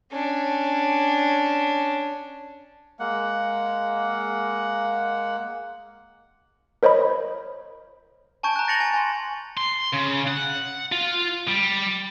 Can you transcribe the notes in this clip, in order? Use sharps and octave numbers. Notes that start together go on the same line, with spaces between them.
C#4 D4
G#3 A#3 F#5
A#4 C5 C#5 D#5 B5
G#5 A5 C#6 G6 G#6 D7
A#5 F#6
A6 A#6 C#7 F7 F#7
G#5
G#5 C6
C6
C#3
F#5
F4
G3